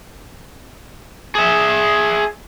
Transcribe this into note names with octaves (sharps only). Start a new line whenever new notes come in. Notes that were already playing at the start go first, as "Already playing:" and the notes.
G#4 E5